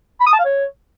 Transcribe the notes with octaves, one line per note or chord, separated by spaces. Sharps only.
B5
D#6
A5
F5
C#5